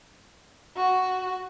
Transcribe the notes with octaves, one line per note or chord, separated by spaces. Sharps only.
F#4